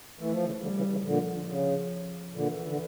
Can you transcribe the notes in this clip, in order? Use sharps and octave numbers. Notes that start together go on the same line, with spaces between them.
E3 A3
F3
C#3 E3
D3 F3 G3
C#3 E3
C#3 E3
A#2 D3 F3
C#3
A#2 D3 E3
D3